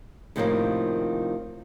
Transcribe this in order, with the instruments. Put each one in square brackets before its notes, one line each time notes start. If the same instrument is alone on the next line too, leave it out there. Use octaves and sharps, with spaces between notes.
[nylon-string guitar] A2 C3 D#3 F3 G3 A#3